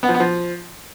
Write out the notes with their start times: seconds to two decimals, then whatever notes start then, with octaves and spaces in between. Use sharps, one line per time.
0.03 B3
0.09 F3
0.14 B3
0.20 F3